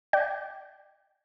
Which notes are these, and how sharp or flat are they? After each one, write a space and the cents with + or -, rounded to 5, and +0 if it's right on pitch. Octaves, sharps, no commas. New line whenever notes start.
D5 +10 G5 -20